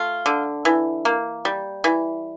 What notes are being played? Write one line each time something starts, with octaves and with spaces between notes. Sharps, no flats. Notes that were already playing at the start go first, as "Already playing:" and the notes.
Already playing: A3 F4
D3
E3
A#3
G3
E3